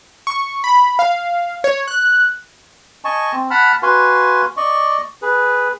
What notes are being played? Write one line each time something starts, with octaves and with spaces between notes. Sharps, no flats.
C#6
B5
F5
C#5
F#6
D#5 G#5 A5 C#6
C4
F#5 A5 B5 F6
F#4 B4 F5 G#5 C6
D5 D#5 C#6
G#4 B4